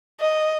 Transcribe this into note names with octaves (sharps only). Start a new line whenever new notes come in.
D#5